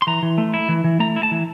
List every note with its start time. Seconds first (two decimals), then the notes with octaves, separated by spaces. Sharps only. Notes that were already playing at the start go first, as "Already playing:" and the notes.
0.02 C6
0.07 E3 A#5
0.23 E3
0.38 A3
0.54 E4
0.69 E3
0.84 E3
1.00 A3 A#5
1.16 E4
1.23 A5
1.31 E3